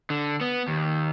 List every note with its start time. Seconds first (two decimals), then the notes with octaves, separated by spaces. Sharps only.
0.10 D3
0.41 B3
0.68 D#2